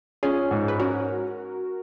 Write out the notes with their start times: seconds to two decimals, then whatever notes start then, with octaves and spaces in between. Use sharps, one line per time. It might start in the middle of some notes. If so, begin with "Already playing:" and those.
0.23 C#4 F4 G#4
0.51 G#2
0.68 B4
0.79 C#4 F#4 A#4